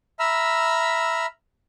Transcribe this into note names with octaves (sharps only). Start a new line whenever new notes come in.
E5 A#5 B5 E6 F6